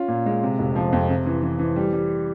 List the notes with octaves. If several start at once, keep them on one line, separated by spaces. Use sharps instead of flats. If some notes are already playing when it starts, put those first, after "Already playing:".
Already playing: C#4 F4
A#2
G#3
C3
F1
F3
F2
C3
E3
E3
E3
G3
G3